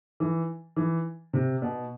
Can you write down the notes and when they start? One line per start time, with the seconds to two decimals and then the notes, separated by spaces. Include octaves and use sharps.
0.20 E3
0.76 E3
1.33 C3
1.62 B2